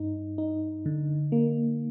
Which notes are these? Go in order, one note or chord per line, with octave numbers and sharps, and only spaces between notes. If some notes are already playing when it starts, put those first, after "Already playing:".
Already playing: G2 D#4
D#4
D3
A#3